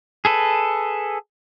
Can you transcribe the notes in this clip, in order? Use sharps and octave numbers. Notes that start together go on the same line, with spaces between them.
G#4 A4 B4